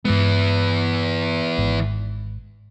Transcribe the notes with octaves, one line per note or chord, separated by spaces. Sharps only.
G2 E3 G#3 B3
G#1 G#2